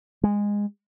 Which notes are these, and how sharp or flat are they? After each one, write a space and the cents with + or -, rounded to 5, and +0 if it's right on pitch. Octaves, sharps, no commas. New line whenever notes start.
G#3 -15